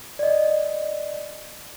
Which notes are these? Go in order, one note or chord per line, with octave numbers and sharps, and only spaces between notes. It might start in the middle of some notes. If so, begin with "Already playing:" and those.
D5 D#5